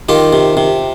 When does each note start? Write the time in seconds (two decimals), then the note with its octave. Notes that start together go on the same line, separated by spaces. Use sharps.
0.09 D#3 F4 G4
0.33 C3
0.57 C3